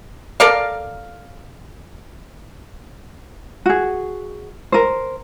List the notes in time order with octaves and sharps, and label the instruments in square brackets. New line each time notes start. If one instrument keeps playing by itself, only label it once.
[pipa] A4 A#4 D5 F5
[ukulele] F#4 G#4
A#4 C5